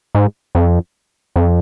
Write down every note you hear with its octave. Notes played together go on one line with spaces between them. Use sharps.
G#2
F2
F2